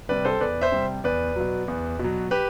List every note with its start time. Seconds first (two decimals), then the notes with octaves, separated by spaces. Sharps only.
0.09 C3 G3 B4 D5
0.25 A4 C5
0.41 E2 B4 D5
0.61 C5 E5
0.72 C3 G3
1.04 E2 B4 D5
1.36 B2 F#3
1.68 E2
1.99 B2
2.04 F#3
2.31 G4 B4